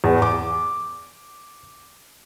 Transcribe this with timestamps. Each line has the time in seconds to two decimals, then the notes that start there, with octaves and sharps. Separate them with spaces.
0.04 E2
0.22 D6